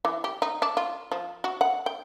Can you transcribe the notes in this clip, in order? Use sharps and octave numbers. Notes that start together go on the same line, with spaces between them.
E3
G4
D#4
D4
F4
F3
F#4
F#5
G5